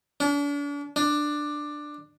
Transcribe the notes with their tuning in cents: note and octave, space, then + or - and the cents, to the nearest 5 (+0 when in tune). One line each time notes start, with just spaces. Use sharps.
D4 -40
D4 +10